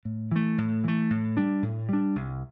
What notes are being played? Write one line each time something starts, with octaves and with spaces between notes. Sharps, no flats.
A2
E3 A3
A2
E3 A3
A2
G3 D4
A2
G3 D4
C2